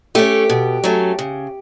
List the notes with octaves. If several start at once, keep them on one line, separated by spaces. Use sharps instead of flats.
A3 C#4 G4
B2
F#3 A3 C#4
C#3